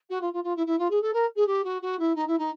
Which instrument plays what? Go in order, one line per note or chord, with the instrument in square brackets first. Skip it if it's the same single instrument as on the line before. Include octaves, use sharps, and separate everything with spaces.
[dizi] F#4
F4
F4
F4
E4
E4
F4
G#4
A4
A#4
G#4
G4
F#4
F#4
E4
D#4
E4
D#4